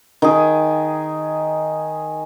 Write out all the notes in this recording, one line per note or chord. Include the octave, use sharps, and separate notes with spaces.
D#3 G#4